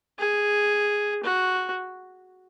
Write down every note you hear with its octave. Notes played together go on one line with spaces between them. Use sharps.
G#4
F#4